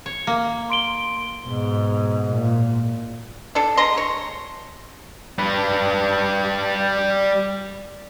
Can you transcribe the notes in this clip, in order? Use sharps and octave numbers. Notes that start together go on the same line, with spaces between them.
C#5
A#3
C6 D7 G7
G#2 B2
A#2
D4 A4
D3 G#3 A#5 C6
C#5
G3 B4